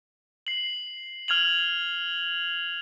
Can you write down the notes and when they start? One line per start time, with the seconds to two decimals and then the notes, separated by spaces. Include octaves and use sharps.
0.47 C7 F#7
1.28 F6 G#6 F7 F#7